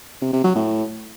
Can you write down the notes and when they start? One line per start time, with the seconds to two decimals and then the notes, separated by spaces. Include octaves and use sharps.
0.22 C3
0.33 C3
0.44 F#3
0.55 A2